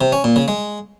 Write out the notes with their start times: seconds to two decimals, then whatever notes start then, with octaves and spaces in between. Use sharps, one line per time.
0.01 C3
0.12 C#4
0.24 A#2
0.36 C#3
0.48 G#3